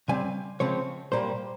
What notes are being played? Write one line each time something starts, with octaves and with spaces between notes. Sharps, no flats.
C#3 G3 C4 G#5
C#3 F3 G#3 C4 C#5
A#2 G3 A#3 C5